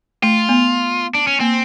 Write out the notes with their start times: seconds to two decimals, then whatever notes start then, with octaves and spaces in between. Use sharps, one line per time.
0.22 A3 F4
0.49 B3
1.15 D4
1.27 C#4
1.40 A#3 C4